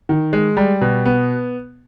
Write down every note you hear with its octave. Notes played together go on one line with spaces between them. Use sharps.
D#3
G#3
G3
B2
B3